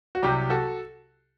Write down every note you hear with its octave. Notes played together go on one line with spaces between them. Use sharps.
F#4
C2 C3 F#3 G4
F#4 A4